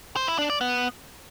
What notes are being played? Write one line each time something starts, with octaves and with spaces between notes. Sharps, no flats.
C5
E4
D4
D5
B3